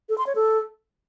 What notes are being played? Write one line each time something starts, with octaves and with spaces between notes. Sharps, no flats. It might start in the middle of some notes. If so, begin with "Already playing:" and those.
A4
C6
C#5
A4